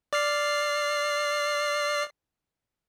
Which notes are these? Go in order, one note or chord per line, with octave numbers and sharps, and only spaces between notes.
D5 F6 C7